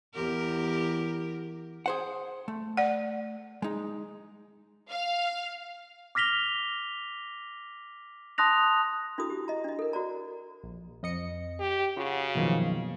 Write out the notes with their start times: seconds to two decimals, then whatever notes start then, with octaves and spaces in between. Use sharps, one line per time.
0.15 E2 G4 A#4
1.86 G#4 C5 F#5
2.48 A3
2.77 D5 F#5
3.62 G#3 D#4
4.90 F5
6.15 D6 F6 A#6 B6 F7 G7
8.38 A5 C6 D#6 F#6 A#6 F7
9.18 D4 E4 F#4 A4 D#6 E6
9.30 G4
9.48 D#5 A#5
9.64 D4 D#5
9.79 A4 A#4
9.93 F#4 C5 D5 A#5
10.64 A#1
11.03 F2 D#5 C#7
11.59 G4
11.97 C#3 F4 F#4
12.35 F#2 B2 D#3 F3 A#3